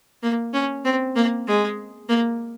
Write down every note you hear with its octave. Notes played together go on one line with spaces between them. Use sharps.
A#3
C#4
C4
A#3
G#3
A#3